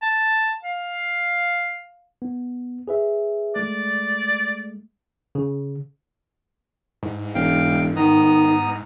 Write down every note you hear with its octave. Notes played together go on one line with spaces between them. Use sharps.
A5
F5
B3
G#4 B4 E5
G#3 A3 D5
C#3
G#2
E1 F5 G5
D#3 B3 A#5 D#6